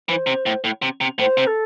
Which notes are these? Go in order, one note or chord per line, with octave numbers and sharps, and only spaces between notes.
E3 C5
C3
A2
A2
C3
C3
A2 C5
C3
A4